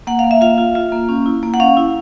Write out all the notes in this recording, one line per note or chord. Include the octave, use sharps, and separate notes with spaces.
A#3 F#5
F5
A#3
E5
F4 F5
F4
F4
A#3
C#4
E4
A#3
F#5
C#4 F5
E4